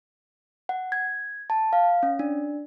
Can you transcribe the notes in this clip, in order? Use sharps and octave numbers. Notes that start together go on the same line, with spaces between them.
F#5
G#6
A5
F5
C#4
D4